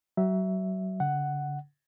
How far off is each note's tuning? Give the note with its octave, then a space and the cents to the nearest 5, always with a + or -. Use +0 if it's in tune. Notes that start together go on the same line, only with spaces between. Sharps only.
F#3 +30 E5 +0
D3 -45 F#5 +5